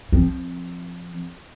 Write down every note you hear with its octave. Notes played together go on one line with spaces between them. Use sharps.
F3 C4